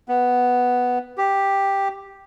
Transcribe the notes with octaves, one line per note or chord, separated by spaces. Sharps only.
B3
G4